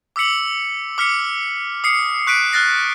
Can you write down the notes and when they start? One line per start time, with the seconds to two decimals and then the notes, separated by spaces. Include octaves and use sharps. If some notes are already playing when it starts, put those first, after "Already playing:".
0.16 D6 E6 B6 C#7 F#7
0.98 D6 F6 B6 C#7
1.84 D#6 C7 C#7
2.27 C#6 F#6 B6 D7 D#7
2.52 F6 F#6 A6 A#6 C7